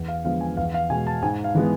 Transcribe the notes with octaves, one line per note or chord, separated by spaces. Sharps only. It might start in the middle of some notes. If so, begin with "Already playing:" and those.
Already playing: E2
F5
D3 F3 G#3 B3 F5
G#5
E2 F5
F5
B2 G#3 G#5
A5
G#2 G#5
F5
E3 G#3 B3